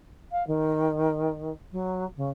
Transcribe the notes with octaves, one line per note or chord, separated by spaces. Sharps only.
F5
D#3
F#3
C#3